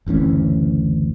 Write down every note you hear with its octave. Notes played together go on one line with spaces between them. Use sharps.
F#1 D2 E3 C#4